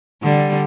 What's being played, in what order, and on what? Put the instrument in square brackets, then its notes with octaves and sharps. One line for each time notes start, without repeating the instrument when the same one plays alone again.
[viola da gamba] D3 G3